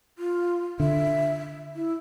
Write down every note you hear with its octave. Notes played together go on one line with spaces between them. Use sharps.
F4
D3 E5
E4